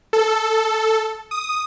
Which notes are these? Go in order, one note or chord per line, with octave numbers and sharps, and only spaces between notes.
A4
D#6